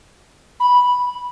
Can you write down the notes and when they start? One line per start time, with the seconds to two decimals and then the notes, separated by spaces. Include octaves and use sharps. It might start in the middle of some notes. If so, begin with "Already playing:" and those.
0.60 B5